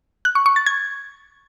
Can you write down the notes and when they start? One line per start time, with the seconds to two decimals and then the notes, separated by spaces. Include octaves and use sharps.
0.25 F#6
0.35 C#6
0.46 C#6
0.56 A6
0.66 G#6